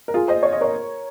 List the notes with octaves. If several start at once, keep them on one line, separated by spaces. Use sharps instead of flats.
A#4
F4 G#4
C5 D#5
C#5
D#5
A#4 C#5